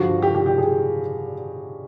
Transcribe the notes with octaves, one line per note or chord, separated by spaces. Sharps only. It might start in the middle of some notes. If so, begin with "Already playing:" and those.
Already playing: G2 D3 F3 F#4
G4
G4
G4
G#4